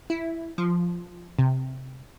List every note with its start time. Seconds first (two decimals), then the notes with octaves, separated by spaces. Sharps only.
0.10 E4
0.58 F3
1.39 C3